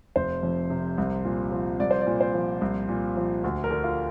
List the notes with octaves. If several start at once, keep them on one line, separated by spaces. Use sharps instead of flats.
F1 C5
F2
C3
C2
A#2
F3
C2 D5
C5
D5
A#2
C5
F3
C2
A#2
F3
D2
A#4
D3
F4